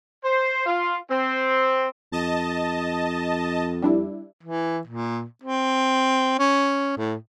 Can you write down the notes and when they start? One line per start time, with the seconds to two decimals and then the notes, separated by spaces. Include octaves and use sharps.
0.24 C5
0.66 F4
1.10 C4
2.12 F2 D#5 A5
3.82 G3 D4 E4
4.43 E3
4.87 A#2
5.43 C4
6.39 C#4
6.97 A2